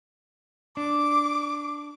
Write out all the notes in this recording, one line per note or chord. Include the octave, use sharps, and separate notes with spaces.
D4 D6